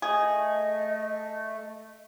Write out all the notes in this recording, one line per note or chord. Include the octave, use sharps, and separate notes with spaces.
A3 G#4 D#5